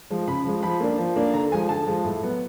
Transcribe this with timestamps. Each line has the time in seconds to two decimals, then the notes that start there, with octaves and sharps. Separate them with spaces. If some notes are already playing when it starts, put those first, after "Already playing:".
0.10 F3 G#3
0.28 C#3 B5
0.45 F3 G#3
0.63 F3 B5
0.80 A#3 D4
0.98 F3
1.16 A#3 D4
1.34 D3 A#5
1.52 F3 G#3 G#5
1.69 D3 A5
1.87 F3 G#3
2.05 A2
2.23 F#3 B3